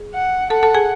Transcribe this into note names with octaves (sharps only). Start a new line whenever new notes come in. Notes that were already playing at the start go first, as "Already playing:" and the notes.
Already playing: G#4
F#5
A4 F#5 A5
A4 A5
G#4 G#5